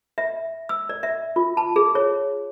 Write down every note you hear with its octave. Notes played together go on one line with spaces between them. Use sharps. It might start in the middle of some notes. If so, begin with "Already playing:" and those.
E5
E6
D5
E5
F4
A5
G#4
C#5